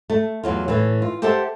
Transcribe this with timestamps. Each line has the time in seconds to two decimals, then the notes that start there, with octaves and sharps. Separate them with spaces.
0.10 A3
0.43 E2 F#3 F4
0.68 A2 E3
1.02 F4
1.22 G4 A4 C5 E5 F#5 A5